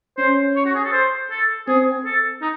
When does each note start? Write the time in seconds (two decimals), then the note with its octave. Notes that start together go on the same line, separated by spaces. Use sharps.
0.18 C#4 C5
0.56 C#5
0.65 F#4
0.75 G#4
0.84 A4
0.92 C5
1.30 A4
1.67 C4 G#4
2.05 A4
2.41 D#4